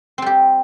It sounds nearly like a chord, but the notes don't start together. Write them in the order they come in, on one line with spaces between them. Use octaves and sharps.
C4 G3 G4